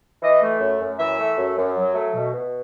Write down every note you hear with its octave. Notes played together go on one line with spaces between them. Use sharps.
E3 D#5
A3
F#2
F#2
E3 E5
A3
F#2
F#2
F#3
A3
B2
B2